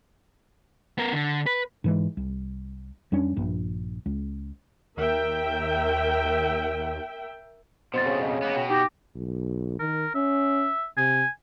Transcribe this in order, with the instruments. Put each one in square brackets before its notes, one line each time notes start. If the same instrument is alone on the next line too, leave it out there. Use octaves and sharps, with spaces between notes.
[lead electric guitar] B3 A#4
D3
B4
[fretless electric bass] G#2 E3 G#3
C2
F2 G3 C#4 D4
A#1 G2
C#2
[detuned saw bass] D#2 [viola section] A#4 E5 G5
[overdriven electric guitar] F2 B2 [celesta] C5 C6 A6
[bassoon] C#3
[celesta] C#5 D#5
[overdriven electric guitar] A#3 B3
[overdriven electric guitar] B2 [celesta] G5
[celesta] D#4 A#6 [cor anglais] G4
[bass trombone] B1
[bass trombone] D#3 [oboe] A#4
[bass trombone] C#4 [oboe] E5
[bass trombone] C3 [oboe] G#5